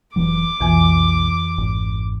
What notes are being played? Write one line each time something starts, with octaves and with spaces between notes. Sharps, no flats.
F1 E3 F#3 D6
B1 F2 E3 G#5
G#1